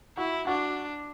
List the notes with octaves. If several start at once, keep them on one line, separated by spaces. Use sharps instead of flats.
E4 F#4
D4 F#4